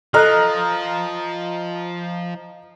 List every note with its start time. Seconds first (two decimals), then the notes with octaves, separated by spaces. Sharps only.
0.14 F3 A4 D#5 A#5 F6 F#6